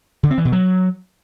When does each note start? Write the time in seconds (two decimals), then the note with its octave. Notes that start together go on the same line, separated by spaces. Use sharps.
0.23 D3
0.31 C4
0.38 E3
0.45 B2
0.52 F#3